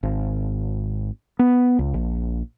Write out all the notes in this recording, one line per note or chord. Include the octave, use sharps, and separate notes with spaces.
G#1
B3
C#2
A#1